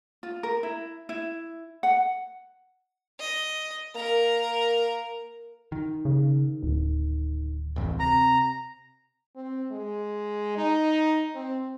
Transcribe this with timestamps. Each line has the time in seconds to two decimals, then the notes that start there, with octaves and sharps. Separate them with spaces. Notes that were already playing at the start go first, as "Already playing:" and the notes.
0.23 F4
0.43 A#4
0.63 E4
1.09 E4
1.83 F#5
3.19 D#5
3.95 A#3 A#4 A#5
5.72 D#3
6.05 C#3
6.62 D1
7.76 E1 A1 F2
8.00 C3 A#5
9.36 C4
9.72 G#3
10.57 D#4
11.35 C4